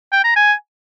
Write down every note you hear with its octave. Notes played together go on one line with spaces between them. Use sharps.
G5
A#5
G#5